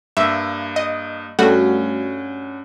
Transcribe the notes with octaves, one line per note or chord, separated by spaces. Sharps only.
G2 A#3 E5
D#5
G2 G3 A3 C#4 F#4 F#5